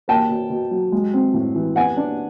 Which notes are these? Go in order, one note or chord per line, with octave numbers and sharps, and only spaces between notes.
A#3 G5 A5
B2
B2
F#3
G#3
C4
A2
E3
B3 F#5 G#5
D4